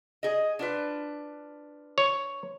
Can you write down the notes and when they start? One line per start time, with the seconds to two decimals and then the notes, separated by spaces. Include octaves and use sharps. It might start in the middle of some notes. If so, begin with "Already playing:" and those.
0.23 G#4 D#5
0.59 D4 F4 B4
1.98 C#5